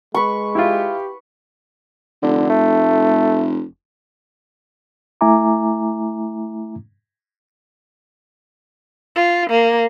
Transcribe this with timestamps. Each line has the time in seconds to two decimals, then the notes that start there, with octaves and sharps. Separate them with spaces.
0.14 G#3 B4 C#6
0.55 E4 F4 G4
2.22 F1 D3
2.49 A3
5.21 A3 E4 E5 G#5 A#5 D6
9.16 F4
9.50 A#3